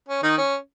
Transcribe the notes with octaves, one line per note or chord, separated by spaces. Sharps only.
C#4
D#3 D#4
C#4